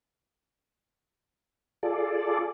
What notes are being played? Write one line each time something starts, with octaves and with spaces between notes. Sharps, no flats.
F4 G#4 A4 D5